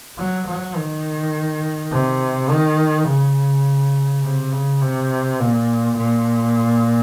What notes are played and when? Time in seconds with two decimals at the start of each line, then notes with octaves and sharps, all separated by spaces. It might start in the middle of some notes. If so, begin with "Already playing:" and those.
0.19 F#3
0.47 F#3
0.76 D#3
1.92 C3
2.50 D#3
3.08 C#3
4.23 C3
4.52 C#3
4.82 C3
5.40 A#2
5.97 A#2